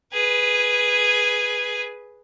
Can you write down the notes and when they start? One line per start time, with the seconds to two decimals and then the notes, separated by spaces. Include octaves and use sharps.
0.13 G#4 B4